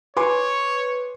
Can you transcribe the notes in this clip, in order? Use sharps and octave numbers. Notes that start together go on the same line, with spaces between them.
B4 C#5 G#5 C6 D6